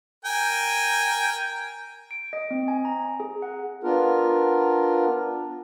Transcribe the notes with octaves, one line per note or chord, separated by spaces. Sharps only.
A#4 G5 G#5
D7
D#5
C4
G#5
A#5
G#4
F#5
B3 D4 F4 A#4